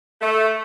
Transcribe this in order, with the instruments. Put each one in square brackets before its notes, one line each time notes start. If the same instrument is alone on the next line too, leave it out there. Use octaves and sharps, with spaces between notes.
[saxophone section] A3